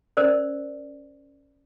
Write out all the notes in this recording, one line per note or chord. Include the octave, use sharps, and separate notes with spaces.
C#4 A#4 C5 D5